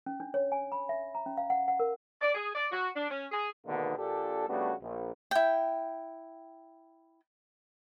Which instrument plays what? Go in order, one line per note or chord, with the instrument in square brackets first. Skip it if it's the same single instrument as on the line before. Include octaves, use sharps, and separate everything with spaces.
[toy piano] C#4
D4
C#5
G#5
B5
E5
A#5
C#4
F5
F#5
F#5
A#4
[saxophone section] D5
G#4
D5
F#4
D4
C#4
G#4
[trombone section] G#2 B2 D3 D#3 A#3 B3
A#1 A#2 D4 G4 A4
C#3 G3 A3 B3 D4 F#4
A#1
[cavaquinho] E4 G5